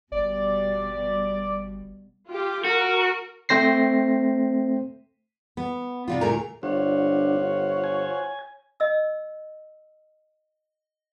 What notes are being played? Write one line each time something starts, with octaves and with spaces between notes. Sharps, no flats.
G1 B2 G3 D5
F4 G4
F#4 A#4
A3 C4 C5 A#6 C7
B3
C3 G3 F4
D2 A#2 A3 G#4 A#4 A#5
G1 D4 F4 C5 C#5 F#5
G#5
D#5 E6